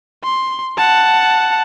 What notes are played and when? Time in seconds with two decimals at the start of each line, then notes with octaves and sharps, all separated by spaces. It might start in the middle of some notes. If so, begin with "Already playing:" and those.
0.24 C6
0.77 F#5 A5